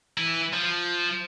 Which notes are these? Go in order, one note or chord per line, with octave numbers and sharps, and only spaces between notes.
E3 E4
F3